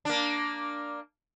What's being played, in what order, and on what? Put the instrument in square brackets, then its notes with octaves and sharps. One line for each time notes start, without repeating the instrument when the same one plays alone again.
[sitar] A#3 D4